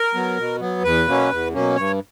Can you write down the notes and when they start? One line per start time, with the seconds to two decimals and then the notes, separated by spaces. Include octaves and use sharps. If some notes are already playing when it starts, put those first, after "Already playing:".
Already playing: A#4
0.14 F#3 B3
0.37 B2
0.60 F#3 B3
0.83 E2 B4
1.07 B2 F#3 A#3 C#4
1.31 E2
1.53 B2 F#3 A#3 C#4
1.76 G2 C#5